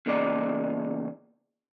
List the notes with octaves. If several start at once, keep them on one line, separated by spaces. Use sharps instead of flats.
E2 A#2 C#3 D#4 D5